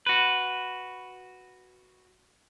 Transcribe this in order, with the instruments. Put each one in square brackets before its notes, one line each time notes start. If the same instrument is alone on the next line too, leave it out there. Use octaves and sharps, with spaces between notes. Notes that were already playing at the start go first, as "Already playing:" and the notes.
[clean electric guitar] F#4 B4